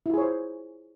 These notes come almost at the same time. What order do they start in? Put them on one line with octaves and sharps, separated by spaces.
E4 F4 G#4 C#5 C5